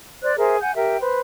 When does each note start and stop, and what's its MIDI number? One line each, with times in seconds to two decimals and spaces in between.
0.23 0.34 72
0.23 0.34 74
0.23 0.34 90
0.38 0.59 68
0.38 0.59 70
0.38 0.59 72
0.38 0.59 76
0.61 0.74 78
0.61 0.74 80
0.61 0.74 91
0.75 0.97 67
0.75 0.97 70
0.75 0.97 76
0.75 0.97 79
1.00 1.21 71
1.00 1.21 72